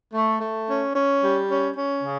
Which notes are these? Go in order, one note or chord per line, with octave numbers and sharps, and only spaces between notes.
A3
A3
C#4
C#4
G3
C#4
C#4
C#3